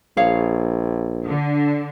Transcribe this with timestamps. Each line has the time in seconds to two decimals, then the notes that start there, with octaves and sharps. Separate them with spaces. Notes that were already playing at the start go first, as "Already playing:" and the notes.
0.17 A#1 G#4 C#5 F5
1.25 D3